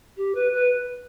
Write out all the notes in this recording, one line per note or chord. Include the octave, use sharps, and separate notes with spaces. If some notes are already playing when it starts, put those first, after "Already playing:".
G4
B4
B4